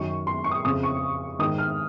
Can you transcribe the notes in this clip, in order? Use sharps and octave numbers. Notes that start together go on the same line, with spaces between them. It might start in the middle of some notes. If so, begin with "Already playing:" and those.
Already playing: F#2 D#3 C#6
C6
C#6
D#6
F2 C#3 D#6
C#6
G#2 D#3 D#6
F6